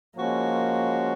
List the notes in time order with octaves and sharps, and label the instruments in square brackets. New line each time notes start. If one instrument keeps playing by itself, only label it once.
[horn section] F3 G#3 C#4 F#4 [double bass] A#3